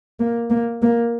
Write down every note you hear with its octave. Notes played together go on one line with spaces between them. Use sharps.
A#3
A#3
A#3